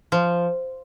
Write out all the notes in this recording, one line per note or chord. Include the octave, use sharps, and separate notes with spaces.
F3